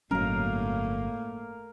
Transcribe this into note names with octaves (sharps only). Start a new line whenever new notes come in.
G1 A2 F#3 A#3 C#4 A#4 F5